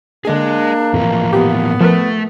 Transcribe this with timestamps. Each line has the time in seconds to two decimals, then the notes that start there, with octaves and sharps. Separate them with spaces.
0.25 D3 G#3 A#3 D4 G#4 D#5
0.94 F2 A2 E3 F3
1.33 B3 G4
1.81 F3 A3 A#4 B4